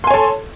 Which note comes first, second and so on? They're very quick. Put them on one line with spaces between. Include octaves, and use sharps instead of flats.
C6 G#5 C#5 A4